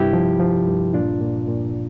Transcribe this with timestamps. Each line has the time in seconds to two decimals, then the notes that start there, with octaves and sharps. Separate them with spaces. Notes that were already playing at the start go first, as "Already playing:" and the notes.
Already playing: G2 C3 E4 G4
0.13 F3
0.40 F3
0.67 G2
0.94 A#2 D4 F4
1.21 A#2
1.47 A#2